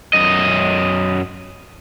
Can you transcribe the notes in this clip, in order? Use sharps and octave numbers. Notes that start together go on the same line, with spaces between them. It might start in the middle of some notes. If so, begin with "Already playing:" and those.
F#2 D#5